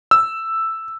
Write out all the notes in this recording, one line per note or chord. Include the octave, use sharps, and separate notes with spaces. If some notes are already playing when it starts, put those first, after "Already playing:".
E6